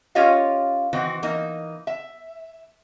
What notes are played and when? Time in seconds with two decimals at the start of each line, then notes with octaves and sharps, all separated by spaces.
0.15 C#4 F4 G4 C#5 D#5 F5
0.93 D#3 E3 C4 F#4
1.23 E3 A#3 D#4
1.87 E5